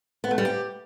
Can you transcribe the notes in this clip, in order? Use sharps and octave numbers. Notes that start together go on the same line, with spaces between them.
B3
A3
G3
G4